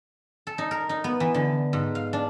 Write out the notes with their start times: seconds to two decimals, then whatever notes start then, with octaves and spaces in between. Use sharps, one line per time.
0.47 A4
0.58 D#4
0.71 A#4
0.89 D#4
1.04 B3
1.20 E3
1.34 D3
1.73 G#2
1.95 F5
2.13 D4